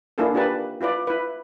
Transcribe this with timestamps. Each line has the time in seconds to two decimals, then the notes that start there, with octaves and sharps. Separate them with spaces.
0.18 A#3 D4 E4 F4 G#4 A4
0.34 D4 F4 G4 A#4 B4 A5
0.81 E4 F4 B4 D5
1.07 E4 B4